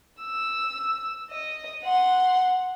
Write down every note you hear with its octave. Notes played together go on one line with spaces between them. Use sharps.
E6
D#5
F#5 C6